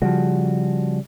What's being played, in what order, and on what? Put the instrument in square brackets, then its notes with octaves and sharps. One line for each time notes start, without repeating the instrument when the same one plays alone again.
[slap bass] C#3 G3 [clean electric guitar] F3 F#4